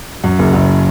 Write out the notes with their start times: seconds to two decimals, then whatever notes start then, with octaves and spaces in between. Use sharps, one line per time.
0.24 F#2
0.39 F#1
0.54 F#1